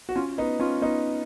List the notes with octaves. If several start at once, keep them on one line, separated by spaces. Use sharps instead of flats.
F#4
C#4 F4
B3 D#4
C#4 F4
B3 D#4